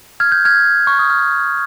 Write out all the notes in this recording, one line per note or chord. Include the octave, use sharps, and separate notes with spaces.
F6 G#6
G6
F6 G#6
C#6
D#6
F6